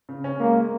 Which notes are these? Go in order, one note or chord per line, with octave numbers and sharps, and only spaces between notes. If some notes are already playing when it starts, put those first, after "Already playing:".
C#3
C#4
G#3 A#3